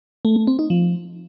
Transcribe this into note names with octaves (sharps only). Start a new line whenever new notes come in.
A3
A3
C4
D#4
F3